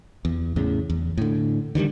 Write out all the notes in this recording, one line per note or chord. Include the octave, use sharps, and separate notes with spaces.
E2
E2 A2 C#3
E2
A2 D3
D3 D#3 F#3 G3